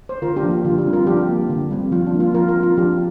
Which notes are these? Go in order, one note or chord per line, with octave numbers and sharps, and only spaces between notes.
C5
D3 F4 A#4
D4 G4
F3 A#3
F4
D3 F4
D4 G4
G3 C4
F4 A#4
F3 D4 G4
A#3
D3
G3 C4
F3 F4
D4
A#3
F4
F3 F4 A#4
F4 A#4
C4
F4
F3 D4 G4